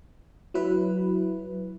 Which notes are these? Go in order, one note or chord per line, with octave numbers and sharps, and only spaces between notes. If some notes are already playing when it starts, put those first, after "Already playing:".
F#3 E4 B4